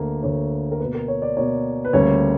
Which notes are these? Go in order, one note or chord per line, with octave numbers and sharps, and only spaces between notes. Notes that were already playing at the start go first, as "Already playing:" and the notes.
Already playing: D2 D3 A#3
D2 D3 A#3 C#5
A#4
B2 A#3 B4
A#4
C#5
D5
B2 A#3 C#5
B4
D2 C#3 G3 A#3 C#5